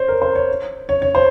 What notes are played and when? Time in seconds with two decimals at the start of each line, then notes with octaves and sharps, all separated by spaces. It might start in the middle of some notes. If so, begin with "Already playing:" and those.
Already playing: C5 C#5
0.08 A#4
0.22 C5
0.35 C#5
0.89 C#5
1.02 C#5
1.15 C5